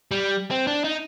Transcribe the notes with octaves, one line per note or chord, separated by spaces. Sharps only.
G3
C4
D4
D#4